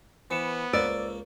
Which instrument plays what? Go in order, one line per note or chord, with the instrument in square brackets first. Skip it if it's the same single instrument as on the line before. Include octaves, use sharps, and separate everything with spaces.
[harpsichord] E3 [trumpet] B3 [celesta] C5 C#7 E7
[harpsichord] C#2 A#3 [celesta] C5 E6 [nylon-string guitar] D5